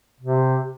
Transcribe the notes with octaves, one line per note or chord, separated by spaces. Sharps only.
C3